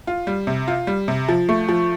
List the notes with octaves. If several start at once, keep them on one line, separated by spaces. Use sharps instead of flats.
F4
G3
C3
F4
G3
C3
F3
A3
F3